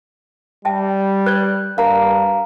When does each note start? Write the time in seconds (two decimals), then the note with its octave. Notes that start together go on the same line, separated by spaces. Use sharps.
0.65 G3 E5 G5 A5
1.26 B4 D5 F#6 G6
1.78 G2 A#4 E5 F5 A#5